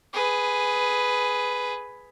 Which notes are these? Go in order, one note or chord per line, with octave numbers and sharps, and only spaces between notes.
G#4 B4